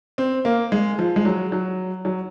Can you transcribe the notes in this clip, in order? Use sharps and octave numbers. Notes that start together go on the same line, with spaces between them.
C4
A#3
G#3
F3
G#3
F#3
F#3
F#3